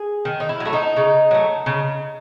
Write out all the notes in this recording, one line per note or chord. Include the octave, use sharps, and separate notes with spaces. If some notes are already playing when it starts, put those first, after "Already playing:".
Already playing: G#4
D#3
D#4
E4
F#3
A3 E4
D#4
C#3
F#3 A3
C#3